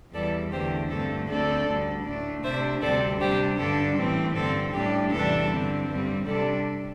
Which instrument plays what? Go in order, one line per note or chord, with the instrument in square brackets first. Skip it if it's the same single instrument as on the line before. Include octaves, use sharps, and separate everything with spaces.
[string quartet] E2 E3 G3 A4 D5
E2 D3 A3 G4 C5
G2 D3 A3 C4 A4
D2 D3 A3 C4 A4 D5
D2 D3 G3
A2 A3 D4
C3 A3 D4 C5 E5
D2 C3 G3 C4 A4 D5
C3 G3 D4 G4 C5
G2 D3 G3 D4 A4
A2 E3 C4
G2 D3 C4 A4
A2 G3 D4 G4
E2 C3 E3 G3 D4 A4
G2 D3 C4
G2 D3 G3 C4
C3 G3 D4 A4 D5